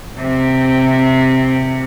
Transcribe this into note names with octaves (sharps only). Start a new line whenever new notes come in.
C3